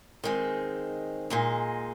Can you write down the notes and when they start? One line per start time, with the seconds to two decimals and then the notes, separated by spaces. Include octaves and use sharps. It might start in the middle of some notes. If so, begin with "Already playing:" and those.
0.24 D#3 G#3 C4
1.30 A#2 G#3 D#4